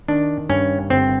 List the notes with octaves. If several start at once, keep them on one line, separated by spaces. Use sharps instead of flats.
D#3 D4
G2 C#4
G1 C4